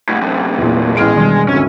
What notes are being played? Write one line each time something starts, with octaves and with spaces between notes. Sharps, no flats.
C2 A2
F#2 C3
E2 A#2
A1 G#3 B3 C#4 E4 F6 D7
E1 D#3 G3 D4 C6
G#1 D2 C#4 G#5 E6